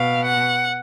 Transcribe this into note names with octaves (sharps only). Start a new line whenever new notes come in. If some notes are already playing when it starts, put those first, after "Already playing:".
Already playing: B2 F5
F#5